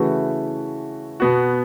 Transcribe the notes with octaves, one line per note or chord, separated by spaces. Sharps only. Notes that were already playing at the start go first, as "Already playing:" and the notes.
Already playing: C#3 E3 A3 F#4 B4
B2 B3 F#4